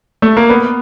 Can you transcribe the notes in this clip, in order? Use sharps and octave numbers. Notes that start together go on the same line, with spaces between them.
A3
A#3
B3